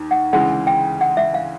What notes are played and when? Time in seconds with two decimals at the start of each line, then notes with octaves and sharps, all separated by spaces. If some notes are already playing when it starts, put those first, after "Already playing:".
Already playing: D#2 D#3
0.11 F#5
0.33 D2 C#3 E3 G#3 F#5
0.67 G5
1.01 F#5
1.17 E5
1.34 F5